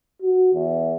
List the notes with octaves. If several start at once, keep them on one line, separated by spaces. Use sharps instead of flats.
F#4
E2